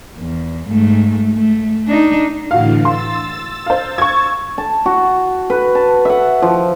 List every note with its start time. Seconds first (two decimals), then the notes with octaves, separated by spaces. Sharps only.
0.19 E2
0.68 G#2 A3
1.34 A3
1.88 D4 D#4
2.51 A2 D3 E3 F#4 F5
2.85 C6 E6 A6
3.66 C5 F5
3.98 C#6 G#6
4.58 A5
4.86 F#4
5.50 B4
5.75 A5
6.05 E5 F#5
6.42 F3